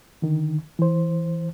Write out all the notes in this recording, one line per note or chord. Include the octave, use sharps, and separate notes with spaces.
D3 D#3
E3 C5